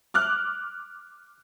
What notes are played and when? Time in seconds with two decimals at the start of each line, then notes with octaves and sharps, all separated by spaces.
0.14 D6 F6 F#6